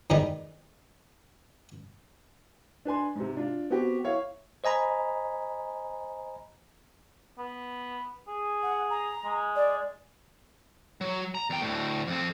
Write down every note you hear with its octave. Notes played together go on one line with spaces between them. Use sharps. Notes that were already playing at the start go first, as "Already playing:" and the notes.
E2 G#2 D#3 G3 D#4
D4 B4 G#5 C6
G#2 C3
D4 F4
B3 C4 F#4 G4
E4 C#5 F5
C5 D#5 G#5 A#5 B5
B3
G#4
F#5
A#5
G#3
D5
F#3
A#5
E2 G5
D2 A2
F2 C4